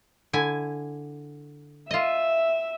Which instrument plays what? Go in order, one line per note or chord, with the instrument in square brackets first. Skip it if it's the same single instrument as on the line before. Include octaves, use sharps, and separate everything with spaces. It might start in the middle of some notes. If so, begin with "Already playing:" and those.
[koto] D3 E4 G#5
[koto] F4 D#5 [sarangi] E5